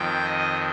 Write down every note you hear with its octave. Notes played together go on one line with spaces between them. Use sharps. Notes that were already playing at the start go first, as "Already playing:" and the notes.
Already playing: F2 D#3 G5
D#5